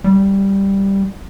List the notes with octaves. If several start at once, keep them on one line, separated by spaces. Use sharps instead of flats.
G3